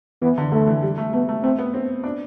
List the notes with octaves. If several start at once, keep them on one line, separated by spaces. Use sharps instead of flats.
E3 B3
D3
D3 A3
E3
G3
A3
A3 B3
A3
A3 C4
B3
C4
D4